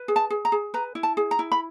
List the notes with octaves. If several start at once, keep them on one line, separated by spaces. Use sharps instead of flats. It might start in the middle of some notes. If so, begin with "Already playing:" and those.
Already playing: B4
G#4
A5
G#4
A#5
G#4
B4 A#5
E4
A5
G#4
A#5
E4
B5